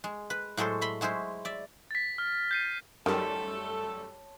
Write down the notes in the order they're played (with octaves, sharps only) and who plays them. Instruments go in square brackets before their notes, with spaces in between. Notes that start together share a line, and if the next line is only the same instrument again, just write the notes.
[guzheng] G#3
B4
A2 F#3 G#3 A4 C5
E5 B5 C6
F#3 G#3 E4 C5
D5 E5
[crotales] A6 B6
F6
G6 C7 D#7
[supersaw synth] F#2 G3 [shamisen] D#3 [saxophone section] A3 A4 [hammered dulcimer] C#5 A5 C6